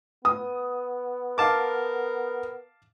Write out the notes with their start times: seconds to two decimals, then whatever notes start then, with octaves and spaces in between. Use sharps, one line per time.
0.25 B3 D#6
1.38 A#4 F5 A5 D6